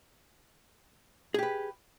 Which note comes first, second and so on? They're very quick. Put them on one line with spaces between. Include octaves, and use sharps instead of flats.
G#4 G4 B4